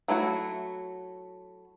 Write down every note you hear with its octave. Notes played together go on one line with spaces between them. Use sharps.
F#3 A3 E4 F#4